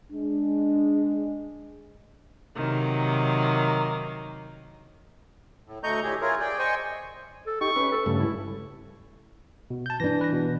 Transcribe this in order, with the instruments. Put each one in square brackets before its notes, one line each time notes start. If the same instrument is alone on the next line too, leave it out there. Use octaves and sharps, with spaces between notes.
[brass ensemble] G#3 D4
[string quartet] C3 D#3 F#3 A#3
[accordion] A2
D2 A3 D#5 A#5 C#6 G6
A2 D3 G4 G#4
E4 F4 G#4 A#4 C#5
G#4 D5 G5
C5 D#5 G5 G#5 C#6
[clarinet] A4
[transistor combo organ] D#4 G4 [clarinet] C#6
[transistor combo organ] C#4 B4
[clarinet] A4
[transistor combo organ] G2 C#3 A3
[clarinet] E4
[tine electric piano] B2
A5 G6
[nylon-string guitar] E3 D4 [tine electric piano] A#6
[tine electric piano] B4 A#6
B2